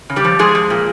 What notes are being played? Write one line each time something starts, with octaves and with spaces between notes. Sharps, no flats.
C#3
G3 G4
F3
F3 G#3 G#4
F3
A#2